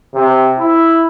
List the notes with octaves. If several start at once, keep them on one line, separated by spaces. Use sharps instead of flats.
C3
E4